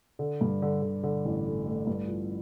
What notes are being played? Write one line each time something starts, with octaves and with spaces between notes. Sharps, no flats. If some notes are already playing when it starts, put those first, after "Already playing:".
D3
G2
D3
D3
D3
A1
A3
A3
G2
F3